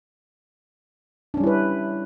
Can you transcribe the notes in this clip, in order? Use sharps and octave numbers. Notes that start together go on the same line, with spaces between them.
G3 C#4 D4 E4 B4